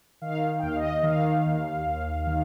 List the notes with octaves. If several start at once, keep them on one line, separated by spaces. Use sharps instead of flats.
D#3 F5
D#2 G5
F5
D#5
D#3 F5
D#2
D#2
D#3